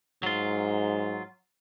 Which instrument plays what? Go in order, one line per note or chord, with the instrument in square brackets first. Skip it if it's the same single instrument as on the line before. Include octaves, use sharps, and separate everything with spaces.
[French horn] G#2 [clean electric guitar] F#3 F4